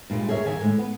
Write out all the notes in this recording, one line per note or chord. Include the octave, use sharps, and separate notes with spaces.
G2 A#2 G#3
G#4 A#4 C#5 E5
D#2 D#3 G#5
A2 G#3
B3